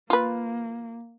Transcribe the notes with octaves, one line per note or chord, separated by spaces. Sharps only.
A#3 F4 B4